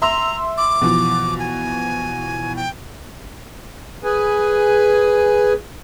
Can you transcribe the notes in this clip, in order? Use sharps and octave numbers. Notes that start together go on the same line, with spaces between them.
E5 A#5 C6 E6
D6
B2 E3 F3
G#5
G5
G#4 B4 G#5